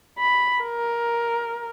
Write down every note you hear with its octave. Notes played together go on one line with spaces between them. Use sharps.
B5
A#4